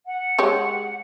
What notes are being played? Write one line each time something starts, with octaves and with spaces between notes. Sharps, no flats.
F#5
G#3 G4 C#5